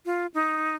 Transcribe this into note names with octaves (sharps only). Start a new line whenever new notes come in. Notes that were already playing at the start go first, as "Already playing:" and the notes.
F4
D#4